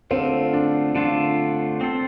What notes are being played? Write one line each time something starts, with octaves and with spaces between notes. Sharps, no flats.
D3 A3 C4 F4
D4
D3 A3 D4 F4
C4 A4 C5